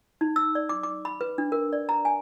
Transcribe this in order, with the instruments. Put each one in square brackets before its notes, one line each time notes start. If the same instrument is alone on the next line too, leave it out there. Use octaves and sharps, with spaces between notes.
[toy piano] D#4
E6
D5
D6
D6
B5
B4
D4
A#4
D5
A#5
G#5